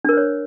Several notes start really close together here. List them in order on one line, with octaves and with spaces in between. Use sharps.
D4 A#4 C5 C#5